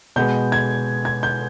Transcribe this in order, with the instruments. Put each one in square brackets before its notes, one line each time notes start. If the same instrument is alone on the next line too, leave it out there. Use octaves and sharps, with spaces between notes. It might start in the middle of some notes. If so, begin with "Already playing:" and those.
[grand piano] B2 G#3 B3 G6
G#6
G#6
G6